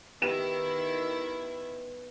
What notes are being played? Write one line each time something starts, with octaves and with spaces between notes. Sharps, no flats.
D#3 B3 E4 G4 E7